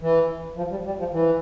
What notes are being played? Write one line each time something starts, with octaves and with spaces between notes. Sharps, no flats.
E3
F3
G3
G3
F3
E3